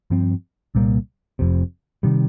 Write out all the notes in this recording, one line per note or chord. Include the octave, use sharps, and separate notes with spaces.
G2 F3 C4
C2 A#2 G3 A#3
F1 F2 C3
C3 D#3 G3